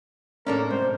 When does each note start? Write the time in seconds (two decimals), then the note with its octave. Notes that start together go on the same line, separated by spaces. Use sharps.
0.47 A2 A#3 C#4 D4 A4 A#4 D5
0.71 G#2 C3 C5